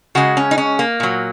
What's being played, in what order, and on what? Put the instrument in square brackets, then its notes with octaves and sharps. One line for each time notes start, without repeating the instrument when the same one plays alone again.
[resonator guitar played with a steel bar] C#3 G#3 F#4
C#4
D#4
C#4
A#3
A#2 F#3